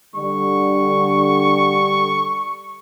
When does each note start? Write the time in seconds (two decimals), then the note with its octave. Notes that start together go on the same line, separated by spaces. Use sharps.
0.16 D3 G3 C#6